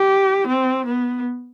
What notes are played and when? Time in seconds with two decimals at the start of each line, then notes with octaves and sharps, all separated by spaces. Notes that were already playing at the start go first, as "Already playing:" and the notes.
Already playing: G4
0.47 C4
0.86 B3